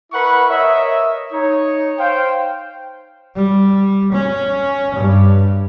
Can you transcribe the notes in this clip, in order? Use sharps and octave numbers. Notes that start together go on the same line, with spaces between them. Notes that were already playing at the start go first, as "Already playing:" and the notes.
E4 A#4 B4 F#5 B5 C#6
A#4 C#5 D#5 E5
D#4 C#5
C5 F5 G5
G3
C#4
G2